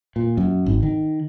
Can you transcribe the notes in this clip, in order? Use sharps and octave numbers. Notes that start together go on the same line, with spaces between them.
A#2
F#2
G#1
D#3